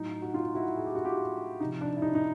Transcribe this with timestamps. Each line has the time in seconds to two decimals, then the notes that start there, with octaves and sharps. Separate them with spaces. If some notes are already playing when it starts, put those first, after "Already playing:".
Already playing: A2 F#3 D#4
0.22 F#4
0.34 D#4 F4
0.55 E4 F#4
0.76 G#4
0.86 G4
0.95 F#4
1.05 F4 G4
1.60 C3 F3 D#4
1.81 D4
1.97 E4
2.02 D#4
2.15 D#4